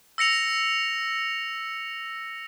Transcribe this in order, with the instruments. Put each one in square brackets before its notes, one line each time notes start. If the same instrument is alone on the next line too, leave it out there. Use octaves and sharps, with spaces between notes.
[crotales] E6 A#6 C#7 F7